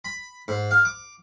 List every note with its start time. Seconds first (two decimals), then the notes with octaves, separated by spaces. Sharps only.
0.05 B5
0.48 G#2
0.71 F5
0.85 D6